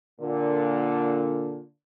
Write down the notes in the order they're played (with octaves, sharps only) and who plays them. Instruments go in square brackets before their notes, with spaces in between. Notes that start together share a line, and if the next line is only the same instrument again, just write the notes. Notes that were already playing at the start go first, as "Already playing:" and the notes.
[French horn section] A#2 D3